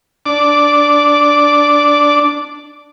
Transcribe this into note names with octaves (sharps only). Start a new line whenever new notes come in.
D4 D6